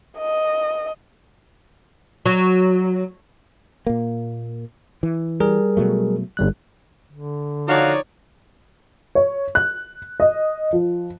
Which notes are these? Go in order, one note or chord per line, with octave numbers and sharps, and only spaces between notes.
D#5
F#3
A#2 A#3
E3
G3 G#4 A#4
B2 F#3 A3
G1 G3 F#6
D3
F3 D#4 F#4 C#5 D5 F5
C#5
F#6
D#5
F3